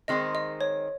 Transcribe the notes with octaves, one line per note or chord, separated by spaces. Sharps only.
D#3 G#3 C4 D#4 D#5
D#5
C#5